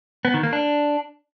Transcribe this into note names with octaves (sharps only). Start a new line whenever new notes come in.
B3
D#3
A#3
D4